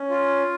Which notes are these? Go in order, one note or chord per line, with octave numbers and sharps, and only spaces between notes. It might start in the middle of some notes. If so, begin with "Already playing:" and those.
Already playing: C#4
F4